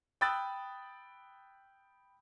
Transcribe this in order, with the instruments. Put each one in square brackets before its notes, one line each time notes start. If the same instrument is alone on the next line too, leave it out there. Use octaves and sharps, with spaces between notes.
[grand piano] G5 B5 D#6 E6 F#6 A6